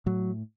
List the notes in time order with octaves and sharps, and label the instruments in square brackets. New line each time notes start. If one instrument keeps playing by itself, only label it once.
[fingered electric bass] A2 F#3